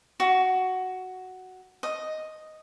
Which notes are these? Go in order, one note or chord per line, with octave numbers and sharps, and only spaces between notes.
F#4
D#5